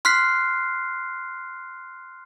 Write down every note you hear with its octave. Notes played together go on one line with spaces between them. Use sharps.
C6 F6 F#6 B6 C7